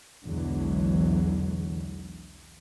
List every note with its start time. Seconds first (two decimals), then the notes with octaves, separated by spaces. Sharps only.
0.25 B1 E2 D3 E3 F#3 G#3